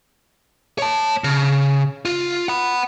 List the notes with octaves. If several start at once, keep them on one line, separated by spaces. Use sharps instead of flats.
C#5 A5
C#3
F4
F#5 B5